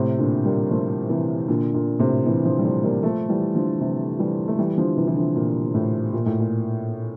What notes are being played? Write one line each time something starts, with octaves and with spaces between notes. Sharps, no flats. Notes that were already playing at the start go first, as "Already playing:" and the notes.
Already playing: A2 C3
A#2 D3
G3 A#3
F3 A3
C3 E3
A#2 D3
A#2 D3
A2 C3
C3 E3
D3 F3
G3
F3 A3
G3 A#3
F3 A3
E3 G3
D3 F3
C3 E3
E3 G3
A3
E3 G3
D3 F3
C3 E3
E3
D3 F3
A#2
A2
A#2
A2
A#2